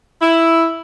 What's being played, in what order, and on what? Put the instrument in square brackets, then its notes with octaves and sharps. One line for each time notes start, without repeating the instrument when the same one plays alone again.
[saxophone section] E4